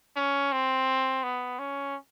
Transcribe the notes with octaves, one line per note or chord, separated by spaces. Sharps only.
C#4
C4
B3
C#4